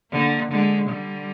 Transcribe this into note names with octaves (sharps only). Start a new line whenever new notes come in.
D3 A#3
D3 G#3
D3 G3